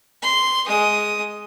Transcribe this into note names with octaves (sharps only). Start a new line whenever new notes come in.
C6
G#3 D#6